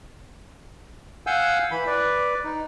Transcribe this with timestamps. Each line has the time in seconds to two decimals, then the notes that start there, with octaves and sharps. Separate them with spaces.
1.27 F5 F#5 G#5 E6 G6
1.71 E3 B5
1.87 B4 D5
2.44 D#4